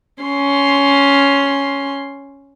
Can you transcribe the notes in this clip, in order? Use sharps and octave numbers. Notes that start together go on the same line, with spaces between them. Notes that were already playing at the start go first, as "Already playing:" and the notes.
C#4 C6